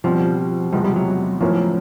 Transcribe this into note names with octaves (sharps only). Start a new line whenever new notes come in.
B2 F3 G3 C4
E2 C3 F3 G3 G#3 B3
G3
F#3
A2 F3 F#3 A#3 C#4 E4